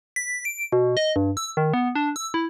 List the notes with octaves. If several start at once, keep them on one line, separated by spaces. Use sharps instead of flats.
B6
D7
B2
D#5
G2
E6
D#3
B3
D4
E6
E4